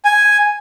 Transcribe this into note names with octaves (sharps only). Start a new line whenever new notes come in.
G#5